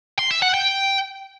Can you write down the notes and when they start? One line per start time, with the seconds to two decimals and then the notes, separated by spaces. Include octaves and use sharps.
0.19 C6
0.31 E5
0.42 F#5
0.54 G5